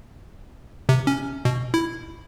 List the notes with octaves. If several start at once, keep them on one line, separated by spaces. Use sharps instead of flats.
C3
C#4
B2
E4